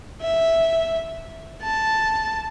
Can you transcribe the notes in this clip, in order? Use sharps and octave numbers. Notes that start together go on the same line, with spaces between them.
E5
A5